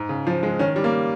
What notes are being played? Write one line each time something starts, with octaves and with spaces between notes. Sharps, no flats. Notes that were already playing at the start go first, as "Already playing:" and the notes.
Already playing: G#2
C#3
F3
G#3
D#3 C#4
G3
A#3